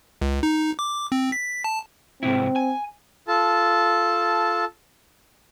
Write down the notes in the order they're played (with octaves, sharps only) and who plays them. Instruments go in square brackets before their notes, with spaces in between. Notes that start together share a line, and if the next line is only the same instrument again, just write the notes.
[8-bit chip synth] C#2
D#4
D6
C4
B6
A5
[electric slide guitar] G#2 C3 E4 [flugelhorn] C4
[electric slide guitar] G#5
[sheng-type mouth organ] F4 A4 A5